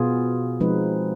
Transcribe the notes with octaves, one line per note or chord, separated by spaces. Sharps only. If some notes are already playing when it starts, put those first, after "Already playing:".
Already playing: B2 B3 F4 G#4
F3 G#3 C4 D#4 B4